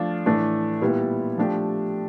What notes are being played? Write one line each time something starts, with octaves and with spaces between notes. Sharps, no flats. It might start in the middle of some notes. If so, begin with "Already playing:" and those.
Already playing: F3 A3 D4 F4
A2 E3 A3 D4
A#2 G3 B3 E4
F3 A3 D4 G4